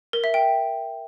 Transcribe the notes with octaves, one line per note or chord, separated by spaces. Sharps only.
A#4
E5
G5